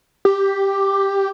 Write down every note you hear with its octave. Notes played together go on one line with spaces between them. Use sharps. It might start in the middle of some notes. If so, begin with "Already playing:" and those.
G4